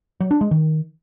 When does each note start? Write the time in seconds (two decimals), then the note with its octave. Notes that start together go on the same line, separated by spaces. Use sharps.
0.20 F#3
0.31 D4
0.41 G#3
0.51 D#3